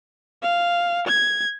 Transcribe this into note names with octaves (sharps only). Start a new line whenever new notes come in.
F5
G#6